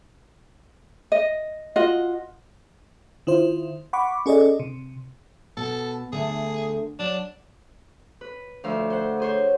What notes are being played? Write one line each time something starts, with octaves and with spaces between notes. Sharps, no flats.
D#5
F4 F#4 D#5
D#3 E4 F4 C5
F#5 B5 C#6 D6
C#4 G#4 A4 D5 D#5
C3
B2 A4
D2 D3 A3 G#4
F#3 D4
B4
D2 F3 F5 E6
C5 F#5
G#4 C5 C#5